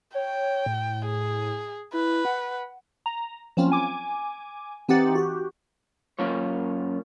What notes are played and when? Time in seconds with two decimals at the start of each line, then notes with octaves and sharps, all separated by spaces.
0.15 C#5 G5
0.66 A2
1.05 G#4
1.93 E4 B4
2.25 F#5
3.06 A#5
3.57 F3 F#3 A#3 C4 C#4 F4
3.72 G#5 D6
4.88 E3 C4 D#4 G4 F#5 A6
5.15 F#4 G4
6.19 F#2 A#3 C#4 F4 C#5